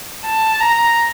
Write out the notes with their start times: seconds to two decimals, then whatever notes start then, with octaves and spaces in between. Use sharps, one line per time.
0.25 A5
0.60 A#5